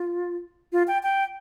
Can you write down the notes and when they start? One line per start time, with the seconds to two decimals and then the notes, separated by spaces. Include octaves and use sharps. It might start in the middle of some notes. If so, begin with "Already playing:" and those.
Already playing: F4
0.73 F4
0.88 G5
1.03 G5